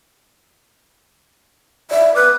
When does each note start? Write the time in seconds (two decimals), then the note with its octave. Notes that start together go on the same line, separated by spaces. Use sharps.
1.91 D5 E5
2.15 B4 D6 F6 F#6